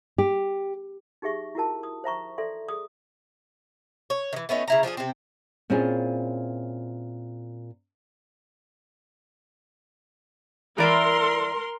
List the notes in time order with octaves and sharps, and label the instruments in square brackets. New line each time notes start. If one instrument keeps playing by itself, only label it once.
[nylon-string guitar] G4
[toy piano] D#4 G4 G#4 E5 C#6
E4 F#4 A#4 A5
D#6
C5 E5 A#5 C#6
A4 D5 E5 C6
G#4 D#6
[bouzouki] C#5
D#3 E3
A3 B3 C#4 D#4
C#3 E4 A#5
F3 D4 F4 G#4
C3 C4
[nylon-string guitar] A#2 C4 C#4 E4 F4 G#4
[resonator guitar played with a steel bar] E3 D5 E5 [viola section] A#4 C6